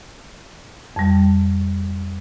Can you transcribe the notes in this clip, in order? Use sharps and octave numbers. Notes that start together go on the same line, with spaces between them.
F2 G3